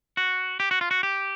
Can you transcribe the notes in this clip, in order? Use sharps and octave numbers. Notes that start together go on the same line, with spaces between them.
F#4
G4
F#4
F4
F#4
G4